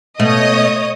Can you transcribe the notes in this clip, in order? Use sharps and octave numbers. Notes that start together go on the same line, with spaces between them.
B2 A3 C#5 D#5 D#6